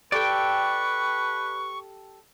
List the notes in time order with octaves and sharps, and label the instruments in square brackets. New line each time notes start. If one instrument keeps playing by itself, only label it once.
[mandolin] G4 A4 [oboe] B4 [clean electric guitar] D5 G5 [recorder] C#6